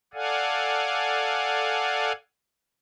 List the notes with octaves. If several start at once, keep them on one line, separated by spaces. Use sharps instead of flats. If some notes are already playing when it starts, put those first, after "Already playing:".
A4 D5 F5 F#5 G#5